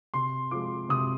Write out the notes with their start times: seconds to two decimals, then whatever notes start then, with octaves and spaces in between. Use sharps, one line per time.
0.14 C3 C6
0.51 F3 G#3 D6
0.89 C3 D#6